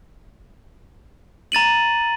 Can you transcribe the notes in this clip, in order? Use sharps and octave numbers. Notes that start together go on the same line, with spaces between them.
A#5 A6 D#7 F#7